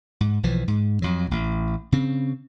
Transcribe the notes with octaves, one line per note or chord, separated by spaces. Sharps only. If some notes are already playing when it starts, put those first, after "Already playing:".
G#2
B1 E3 F3
G#2
F2 F#3
A1
C#3 C4